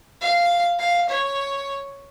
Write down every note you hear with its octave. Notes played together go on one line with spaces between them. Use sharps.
F5
F5
C#5